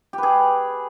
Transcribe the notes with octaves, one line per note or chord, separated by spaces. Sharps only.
G4 G#4 B4